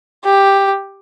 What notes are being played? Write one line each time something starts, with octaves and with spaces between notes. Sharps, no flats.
G4